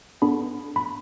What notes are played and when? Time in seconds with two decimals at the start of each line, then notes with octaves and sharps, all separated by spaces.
0.22 B3 D4 A4 B5
0.76 B5